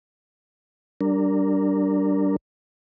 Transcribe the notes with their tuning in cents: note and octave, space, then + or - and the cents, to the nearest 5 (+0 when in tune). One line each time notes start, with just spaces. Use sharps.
G3 -25 D4 -10 A#4 -10